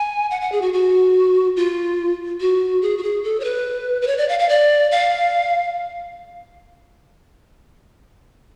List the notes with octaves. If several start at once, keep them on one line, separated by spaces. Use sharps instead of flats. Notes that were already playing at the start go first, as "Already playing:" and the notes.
Already playing: G#5
F#5
F#5
G#4
F#4
F#4
F4
F#4
G#4
F#4
G#4
A4
C#5
B4
B4
C#5
D5
F5
F5
D5
F5